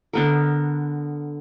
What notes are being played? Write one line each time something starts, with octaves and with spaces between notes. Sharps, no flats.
D3 B3 A#4